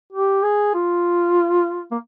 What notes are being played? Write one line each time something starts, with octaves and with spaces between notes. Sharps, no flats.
G4
G#4
F4
A#3